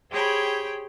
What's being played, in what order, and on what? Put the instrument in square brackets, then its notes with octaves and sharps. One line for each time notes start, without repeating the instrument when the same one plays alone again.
[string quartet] G4 G#4 C5 C#5 G5 B5